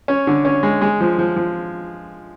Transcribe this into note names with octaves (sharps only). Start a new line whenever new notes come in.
C#4
D3
C#4
G#3
G#3
F3
F3
F3